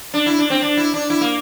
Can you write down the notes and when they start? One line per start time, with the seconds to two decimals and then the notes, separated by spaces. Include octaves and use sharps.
0.14 D4
0.26 E4
0.39 D4
0.50 C4
0.62 D4
0.77 E4
0.94 D4
1.10 E4
1.21 A#3